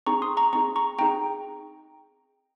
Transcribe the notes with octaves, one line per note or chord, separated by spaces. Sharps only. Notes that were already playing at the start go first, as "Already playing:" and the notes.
C4 D#4 G#4 A#5 C#6
C6 D#6
A#5 C#6
C4 D#4 G#4 A#5 C#6
A#5 C#6
C4 D#4 G#4 G5 A#5